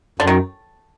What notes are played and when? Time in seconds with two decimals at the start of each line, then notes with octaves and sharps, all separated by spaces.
0.19 F#2 D3
0.27 D#3